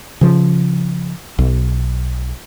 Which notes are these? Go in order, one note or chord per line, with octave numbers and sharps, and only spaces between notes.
C#3 F3
B1